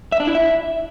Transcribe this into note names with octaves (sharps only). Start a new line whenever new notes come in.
E5
D4
E4
E5